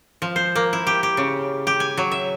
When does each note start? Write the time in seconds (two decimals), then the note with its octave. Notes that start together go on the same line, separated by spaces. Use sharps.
0.22 F3
0.36 C5
0.56 A#3
0.73 E4
0.87 G4
1.03 G4
1.17 C#3
1.67 G4
1.80 G#5
1.97 F#3
2.12 E5